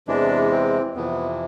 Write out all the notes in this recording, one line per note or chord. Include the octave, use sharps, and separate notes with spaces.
E2 C3 E3 G#3 D4
C4
F2 C3 E3 B3